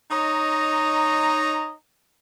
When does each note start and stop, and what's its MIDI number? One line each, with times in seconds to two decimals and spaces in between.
0.11 1.73 63
0.11 1.73 73
0.11 1.73 75
0.11 1.73 82